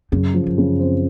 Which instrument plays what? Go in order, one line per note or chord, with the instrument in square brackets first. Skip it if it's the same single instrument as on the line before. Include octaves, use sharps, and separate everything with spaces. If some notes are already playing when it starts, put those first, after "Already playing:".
[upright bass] F#2 [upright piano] C#3
[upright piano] F3
[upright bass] F#2
[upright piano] C#3
C4